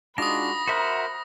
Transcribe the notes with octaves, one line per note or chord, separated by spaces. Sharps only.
G#3 D4 D#4 F4 F#4 B5 D#6 A#6
F#4 A#4 C5 E5 F#5